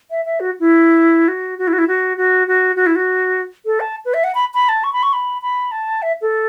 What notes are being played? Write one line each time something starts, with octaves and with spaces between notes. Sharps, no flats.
E5
E5
F#4
E4
F#4
F#4
E4
F#4
E4
F#4
F#4
F#4
F#4
E4
F#4
A4
A5
B4
E5
F#5
B5
B5
A5
C#6
B5
C#6
B5
B5
A5
E5
A4